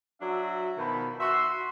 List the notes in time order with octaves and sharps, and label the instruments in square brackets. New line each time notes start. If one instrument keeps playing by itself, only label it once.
[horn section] F#3 D4 F#4 E5
B2 D#3 F3 B5
F#4 E5 F#5 C6